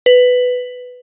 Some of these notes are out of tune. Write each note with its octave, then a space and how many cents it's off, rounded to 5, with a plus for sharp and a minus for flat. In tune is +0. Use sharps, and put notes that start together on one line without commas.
B4 +10